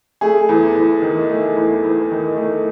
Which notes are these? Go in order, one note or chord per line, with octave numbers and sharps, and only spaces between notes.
A3 G#4
E2
E2
D#3
A3
E2
E2
D#3
A3